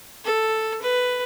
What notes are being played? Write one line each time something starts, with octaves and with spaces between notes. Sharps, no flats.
A4
B4